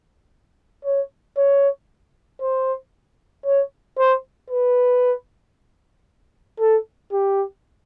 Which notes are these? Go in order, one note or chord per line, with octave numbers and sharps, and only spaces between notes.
C#5
C#5
C5
C#5
C5
B4
A4
G4